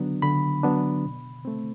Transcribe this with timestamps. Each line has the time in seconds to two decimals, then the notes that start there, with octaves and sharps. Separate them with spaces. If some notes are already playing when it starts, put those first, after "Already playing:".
Already playing: D3 F#3 B3 D4
0.22 D3 B5
0.63 F#3 B3 D4
1.05 B2
1.45 A3 C4